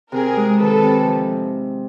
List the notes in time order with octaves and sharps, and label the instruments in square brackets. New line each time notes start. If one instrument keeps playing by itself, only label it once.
[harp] C3 [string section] G#4 A#4
[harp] G#3
[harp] D#3 [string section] A4 B4
[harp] C3
F3